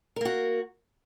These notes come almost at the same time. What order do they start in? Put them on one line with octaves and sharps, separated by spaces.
A#4 A#3 F#4